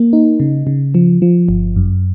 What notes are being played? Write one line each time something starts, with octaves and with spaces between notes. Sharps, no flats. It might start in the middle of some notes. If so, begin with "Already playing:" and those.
Already playing: A#3
D#4
C#3
C#3
F3
F3
G1
F#2